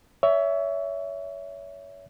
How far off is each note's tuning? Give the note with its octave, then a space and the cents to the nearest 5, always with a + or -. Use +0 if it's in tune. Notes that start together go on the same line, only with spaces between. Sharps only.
C#5 +30 E5 +0